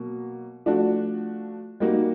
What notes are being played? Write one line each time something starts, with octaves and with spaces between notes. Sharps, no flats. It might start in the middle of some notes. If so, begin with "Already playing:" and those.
Already playing: B2 F#3 A#3
F3 A3 D4 F#4
G3 A#3 D#4 F#4